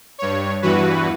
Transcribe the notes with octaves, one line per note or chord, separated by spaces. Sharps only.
G2 C#5
E2 G2 E3 F#4 B4